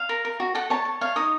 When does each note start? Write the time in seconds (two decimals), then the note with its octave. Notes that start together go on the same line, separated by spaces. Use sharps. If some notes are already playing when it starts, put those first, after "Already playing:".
Already playing: F5
0.09 A#4
0.25 A#4
0.40 F#4
0.55 A4 F#5
0.70 C#5 A5
0.85 A4
1.01 C#5 F5
1.16 D#4 D#6